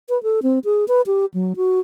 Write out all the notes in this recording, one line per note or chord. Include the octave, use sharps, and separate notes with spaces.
B4
A4
C4
G#4
B4
G4
F#3
F#4